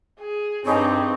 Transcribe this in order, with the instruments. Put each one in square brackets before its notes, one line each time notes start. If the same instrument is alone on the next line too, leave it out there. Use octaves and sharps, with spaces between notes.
[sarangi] G#4
[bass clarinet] G2 [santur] G3 G#4 C#5 [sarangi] C4 [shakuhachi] D#4